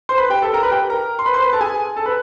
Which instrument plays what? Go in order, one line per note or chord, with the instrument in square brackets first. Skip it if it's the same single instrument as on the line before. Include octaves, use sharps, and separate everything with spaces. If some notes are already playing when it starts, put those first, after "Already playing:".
[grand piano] C5 C6
B4 B5
G4 G5
A4 A5
A#4 A#5
B4 B5
G4 G5
A#4 A#5
C6
B4 B5
C5 C6
B4 B5
A4 A5
G#4 G#5
A4 A5
B4 B5